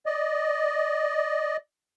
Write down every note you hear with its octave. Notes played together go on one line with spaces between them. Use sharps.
D5 D#5